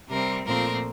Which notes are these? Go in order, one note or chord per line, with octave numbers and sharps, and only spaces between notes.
C3 G3 C4 A#4
A#2 F3 A3 C4 A#4